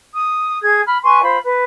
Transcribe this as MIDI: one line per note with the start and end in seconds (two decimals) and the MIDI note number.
0.14 0.60 87
0.61 0.81 68
0.61 0.81 92
0.86 0.98 83
0.86 0.98 89
1.03 1.19 71
1.03 1.19 80
1.03 1.19 84
1.03 1.19 85
1.22 1.38 65
1.22 1.38 72
1.22 1.38 83
1.43 1.64 71